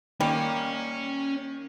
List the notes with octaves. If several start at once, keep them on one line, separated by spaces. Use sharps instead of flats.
D#3 G3 A#3 C#4